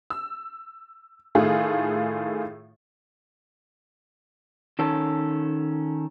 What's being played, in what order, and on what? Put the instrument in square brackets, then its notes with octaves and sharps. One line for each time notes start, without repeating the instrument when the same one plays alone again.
[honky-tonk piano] E6
A2 D#3 A3 F4 G#4
[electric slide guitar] D#3 C#4 A4